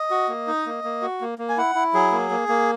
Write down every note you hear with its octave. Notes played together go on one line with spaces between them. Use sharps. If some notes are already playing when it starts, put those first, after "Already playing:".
Already playing: D#5
F#4
A#3
D#4
A#3
A#3
F#4
A#3
A#3
G#5
E4 F#5
E4
F#3 G#4
A#3
A#3
A#3